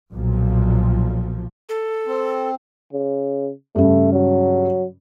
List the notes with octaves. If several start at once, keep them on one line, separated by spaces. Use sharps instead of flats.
B1 A#2 F3
A4
C4
C#3
G2 C#3 A3
F#3